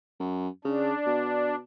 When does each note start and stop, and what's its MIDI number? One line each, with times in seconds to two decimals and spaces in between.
0.20 0.48 42
0.65 0.92 49
0.65 1.55 62
1.06 1.59 47